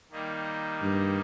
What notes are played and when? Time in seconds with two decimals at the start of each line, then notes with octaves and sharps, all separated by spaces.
0.10 D#3 G3 A#3 D#4
0.82 G2